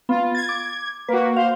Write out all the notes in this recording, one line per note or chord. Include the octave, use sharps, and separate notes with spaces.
B3 F4
G#6 A6
D6
A#3 F#4 B4
C5 F5